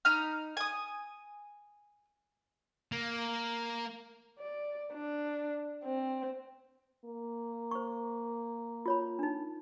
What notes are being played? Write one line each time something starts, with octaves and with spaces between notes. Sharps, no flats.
D#4 A#5 B5 F6
G#5 D#6
A#3
D5
D4
C4
A#3
C5 C#6
F4 C#5 B5
D4 D#4